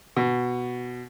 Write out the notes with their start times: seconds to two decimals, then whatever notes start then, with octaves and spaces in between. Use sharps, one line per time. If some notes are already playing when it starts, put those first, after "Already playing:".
0.16 B2